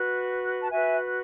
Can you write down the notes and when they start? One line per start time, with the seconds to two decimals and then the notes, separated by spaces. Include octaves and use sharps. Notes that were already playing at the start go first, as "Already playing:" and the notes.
Already playing: F#4 B4
0.62 A5
0.72 F#4 B4 E5 G#5